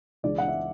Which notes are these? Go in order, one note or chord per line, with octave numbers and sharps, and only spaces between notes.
C#2 C#3 E3 G#3 D4 D5
F#5
E5